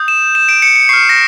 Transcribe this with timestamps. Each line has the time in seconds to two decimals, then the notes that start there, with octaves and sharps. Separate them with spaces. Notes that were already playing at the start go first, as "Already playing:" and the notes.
Already playing: D#6 G6
0.08 E7
0.35 E7
0.49 D7
0.62 C#7
0.76 C#7
0.89 C#6 F6 C7
1.09 A#6